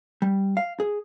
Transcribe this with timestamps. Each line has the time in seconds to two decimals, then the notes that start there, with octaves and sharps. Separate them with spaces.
0.22 G3
0.57 F5
0.80 G#4